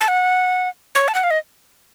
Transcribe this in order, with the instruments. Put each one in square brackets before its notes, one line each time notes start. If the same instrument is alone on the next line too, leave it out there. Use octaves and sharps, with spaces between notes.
[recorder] A5
F#5
C#5
A5
F#5
F5
D#5